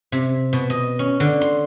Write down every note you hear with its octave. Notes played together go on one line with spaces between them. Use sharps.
C3
B2
D#5
C#4
D3
C6